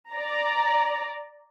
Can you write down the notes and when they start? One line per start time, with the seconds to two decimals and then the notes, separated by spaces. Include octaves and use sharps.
0.12 D5 A#5